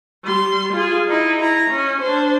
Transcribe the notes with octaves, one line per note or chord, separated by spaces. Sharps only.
G3 C6
F4 G#4
D#4 E4
E4 A#5
C#4
D4 C5